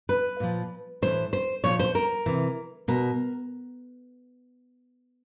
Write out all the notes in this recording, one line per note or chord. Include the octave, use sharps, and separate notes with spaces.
B4
A#2 F3
A2 E3 C5
C5
A#2 F3 C#5
C5
A#4
C3 E3
B2 A#4